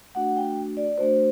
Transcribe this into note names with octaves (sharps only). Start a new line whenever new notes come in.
A3 D4 F#4 F#5
G5
D5
A3 D4 F#4 C5